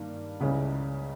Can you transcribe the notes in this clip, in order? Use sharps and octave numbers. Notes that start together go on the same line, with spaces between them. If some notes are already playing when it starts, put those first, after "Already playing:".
Already playing: G2 D#3 G3 A#3
C#2 C#3 G3 C#4 E4